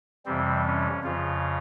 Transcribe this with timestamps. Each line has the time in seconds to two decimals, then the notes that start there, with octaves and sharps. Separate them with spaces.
0.26 F2 C3 E3 G3 C4
0.65 C#4
1.03 F2 C#3 F3 F4